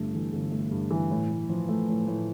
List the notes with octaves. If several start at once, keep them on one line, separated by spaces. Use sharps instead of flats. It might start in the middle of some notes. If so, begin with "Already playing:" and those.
Already playing: G1 G2 A3
E3
G1
A3
G2
E3
A2
A2
F3
A3
A2
A2